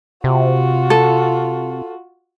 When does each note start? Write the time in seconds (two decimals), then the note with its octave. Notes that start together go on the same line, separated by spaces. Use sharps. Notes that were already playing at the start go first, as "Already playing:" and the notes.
0.24 C3 F4 F#4
0.90 A4